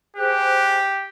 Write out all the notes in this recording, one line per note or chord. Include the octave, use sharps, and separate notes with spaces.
G4 G#4 C5 F#6